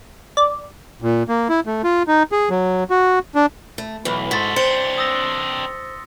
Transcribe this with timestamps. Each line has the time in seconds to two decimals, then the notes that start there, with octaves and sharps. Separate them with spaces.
0.37 D5
1.02 A#2
1.29 A#3
1.49 E4
1.67 A3
1.84 F4
2.07 D#4
2.32 G#4
2.50 F#3
2.90 F#4
3.35 D4
3.78 A3
4.05 B1 E3
4.31 G#2 F#4 A4 C6 A6 B6
4.56 C4 D4 C5 C#7 G7
4.98 D#6 E6 A#6